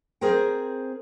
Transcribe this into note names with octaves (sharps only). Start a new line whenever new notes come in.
C4 G#4 A#4 C5 G5